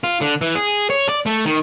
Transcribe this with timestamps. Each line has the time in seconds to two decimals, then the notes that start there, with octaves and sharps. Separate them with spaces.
0.04 F4
0.21 D3
0.41 E3
0.55 G#4
0.90 C#5
1.09 D5
1.26 A3
1.46 D#3